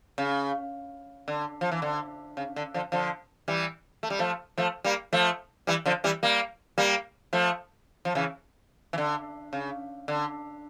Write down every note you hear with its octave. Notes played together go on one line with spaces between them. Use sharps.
C#3
D3
F3
E3
D3
C#3
D3
D3 F3
D3 F3
E3 G3
A3
G3
F3 A3
F3 A3
G3 A#3
F3 A3
E3 G3
D3 F3
E3 G3
G3 A#3
G3 A#3
F3 A3
F3
C#3 E3
E3
D3
C#3
D3